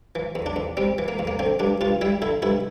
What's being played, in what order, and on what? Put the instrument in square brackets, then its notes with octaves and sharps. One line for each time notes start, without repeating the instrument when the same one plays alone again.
[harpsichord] E3
E2
D4
E2
G3 C4
E3
A#3
E2
A#3
D3 C4
G2 D4
G2 F4
G3 E4
D3 E4
G2 E4